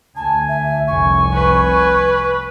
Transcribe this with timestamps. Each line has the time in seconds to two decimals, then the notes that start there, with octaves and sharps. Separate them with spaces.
0.16 D2 G#5 A5
0.49 E5
0.88 F1 C2 G#5 C#6
1.33 B4